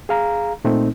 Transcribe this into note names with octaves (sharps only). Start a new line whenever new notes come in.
G#4 F5 A#5
A#2 A3 C4 D#4